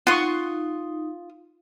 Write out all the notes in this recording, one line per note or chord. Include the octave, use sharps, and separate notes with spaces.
D#4 F4 F#5 C6 C#6 D#6